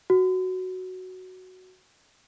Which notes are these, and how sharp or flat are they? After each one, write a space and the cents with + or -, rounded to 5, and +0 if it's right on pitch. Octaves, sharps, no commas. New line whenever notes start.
F#4 +5